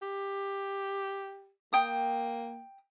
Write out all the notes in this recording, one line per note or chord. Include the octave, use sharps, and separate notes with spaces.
G4
A#3 G5 D#6